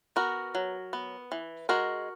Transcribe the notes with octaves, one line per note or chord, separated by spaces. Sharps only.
B3 F#4 A#4
F#3
B3
E3
G#3 F#4 A#4